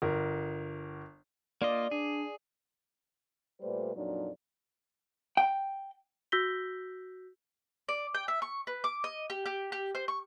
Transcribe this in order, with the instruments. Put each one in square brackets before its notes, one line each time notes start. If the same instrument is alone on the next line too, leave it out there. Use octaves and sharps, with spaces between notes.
[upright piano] G1 A#4
[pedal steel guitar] A#3 F4 D#5 [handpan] D5
[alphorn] D4 [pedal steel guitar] G#4
[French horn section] A#2 G3 A3 B4 C5 D5
F2 A#2 F#3 D4 D#4 D5
[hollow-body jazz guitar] G5
[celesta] F#4 E6 G6 A#6 B6 G7
[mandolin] D5
G5
E5
C#6
B4
D6
D#5
G4
G4
G4
C5
C#6